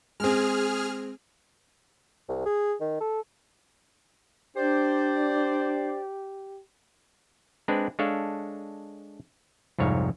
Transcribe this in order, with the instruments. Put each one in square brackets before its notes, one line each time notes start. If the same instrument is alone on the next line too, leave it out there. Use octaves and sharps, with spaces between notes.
[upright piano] G#3 C4 [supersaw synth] G#4 F6
[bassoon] C2
G#4
D#3
A4
[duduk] D4 [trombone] G4 [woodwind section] C5 D5
[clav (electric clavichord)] G#3 C4 D4 B4 D5
G#3 D4 A4 C#5 F5
C2 F2 G#2 C#5 F5